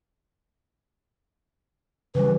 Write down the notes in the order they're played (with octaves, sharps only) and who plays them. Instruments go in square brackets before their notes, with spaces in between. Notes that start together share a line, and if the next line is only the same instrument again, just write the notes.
[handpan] C#3 E3 G3 [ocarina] B4